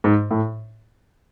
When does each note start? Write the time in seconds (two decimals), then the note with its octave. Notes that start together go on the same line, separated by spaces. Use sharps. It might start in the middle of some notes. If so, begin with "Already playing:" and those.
0.04 G#2
0.31 A2